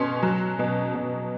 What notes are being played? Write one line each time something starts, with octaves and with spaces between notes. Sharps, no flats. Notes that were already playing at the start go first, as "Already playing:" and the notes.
Already playing: B2 C#4 C6
F#3
B2
B2